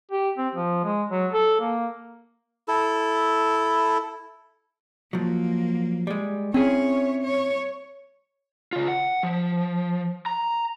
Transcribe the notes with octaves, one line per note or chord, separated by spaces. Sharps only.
G4
C4
F3
G#3
F#3
A4
A#3
E4 A4
F3 F#3 A#3
G3 G#3
C4 C#4 E4 G#4 C#5
C#5
C#3 F4
F#5
F3
A#5